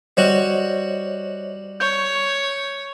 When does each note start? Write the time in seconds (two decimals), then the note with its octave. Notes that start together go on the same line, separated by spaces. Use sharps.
0.17 G3 F#4 C5 C#5 D#5
1.80 C#5 G6